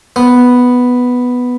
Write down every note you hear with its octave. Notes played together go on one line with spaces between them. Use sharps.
B3